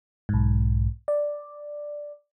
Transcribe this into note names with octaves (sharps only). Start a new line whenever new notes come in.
B1 G#2
D5